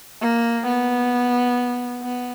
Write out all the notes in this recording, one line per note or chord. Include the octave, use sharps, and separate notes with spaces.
A#3
B3
B3